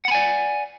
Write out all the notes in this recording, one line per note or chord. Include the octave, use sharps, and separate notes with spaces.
D5 F#5 G#5 B5